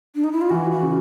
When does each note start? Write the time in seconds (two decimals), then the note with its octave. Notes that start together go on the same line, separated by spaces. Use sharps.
0.15 D4
0.24 D#4
0.32 E4
0.41 F4
0.50 E3 F#4
0.71 F#4
0.82 C#3